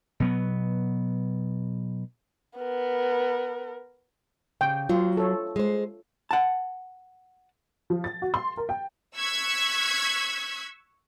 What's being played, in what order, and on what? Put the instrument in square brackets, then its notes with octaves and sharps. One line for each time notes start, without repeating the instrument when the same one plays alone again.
[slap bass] B2 F#3 B3
[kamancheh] B3 A#4
[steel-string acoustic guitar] C#3 [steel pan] G5
[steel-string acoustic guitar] F#3 [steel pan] F4
[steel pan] A4 C#5
[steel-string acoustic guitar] G#3 C5
[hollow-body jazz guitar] F#5 A5
[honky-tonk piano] F3
A6
F#4
C6
A#4
G5
[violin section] C#6 E6 F#6 G#6 B6